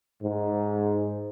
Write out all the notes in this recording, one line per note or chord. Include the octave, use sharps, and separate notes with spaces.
G#2